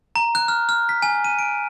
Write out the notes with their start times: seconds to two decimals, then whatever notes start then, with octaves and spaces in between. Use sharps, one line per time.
0.16 A#5
0.35 F#6
0.48 F6
0.69 F6
0.89 B6
1.02 G#5
1.24 D#7
1.39 D7